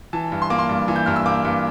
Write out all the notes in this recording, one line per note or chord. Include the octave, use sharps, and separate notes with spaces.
E3 A5
G2
C6
A#3 D6
C6
G2
E3
G6
G2 F6
E6
A#3 D6
G2